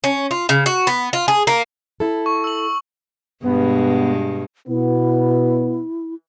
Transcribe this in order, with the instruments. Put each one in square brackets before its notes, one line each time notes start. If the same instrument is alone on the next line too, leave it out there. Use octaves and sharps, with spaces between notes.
[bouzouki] C#4
F4
C#3
F#4
B3
F4
G#4
A#3
[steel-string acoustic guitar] E4 A4
[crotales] C#6
E6 F#7
[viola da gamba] G2 B2 G#3 [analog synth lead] B3
[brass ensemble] B2 B3 [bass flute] E4